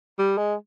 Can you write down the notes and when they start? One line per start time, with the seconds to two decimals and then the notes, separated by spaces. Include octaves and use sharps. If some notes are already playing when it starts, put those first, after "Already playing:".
0.19 G3
0.38 G#3